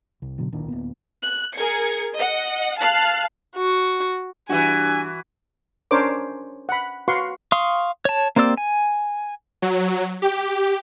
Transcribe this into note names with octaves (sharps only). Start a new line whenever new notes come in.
C2
F#1 B2 D3 F#3
D1 A#1 D#3 D4
D1 A#3 B3
F#6
G#4 A#4 G#6 C#7
D#5 F#5
F5 A5 F6 F#6 C7
F#4
G2 E3 F#4 G#5
C#4 D4 A#4 C5 C#5 D6
F#5 B5
F#4 B4 F5 F#5 C6 C#6
F5 C6 C#6 D#6
C#5 A5
A#3 C4 G4 D5 E6
G#5
F#3
G4